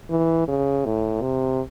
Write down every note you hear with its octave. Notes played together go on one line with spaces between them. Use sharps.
E3
C#3
A2
C3